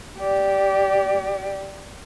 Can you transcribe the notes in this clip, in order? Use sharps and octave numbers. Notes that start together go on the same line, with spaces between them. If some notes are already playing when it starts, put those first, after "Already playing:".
G4 D5